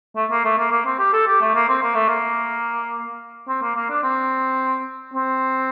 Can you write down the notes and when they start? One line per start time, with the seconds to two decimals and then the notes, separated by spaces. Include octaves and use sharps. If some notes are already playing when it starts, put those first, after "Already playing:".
0.16 A3
0.31 A#3
0.44 A3
0.58 A#3
0.71 A#3
0.86 C4
0.99 G4
1.13 A4
1.27 G4
1.41 A3
1.54 A#3
1.69 C4
1.83 A#3
1.95 A3
2.08 A#3
3.48 C4
3.62 A#3
3.76 A#3
3.89 D4
4.03 C4
5.14 C4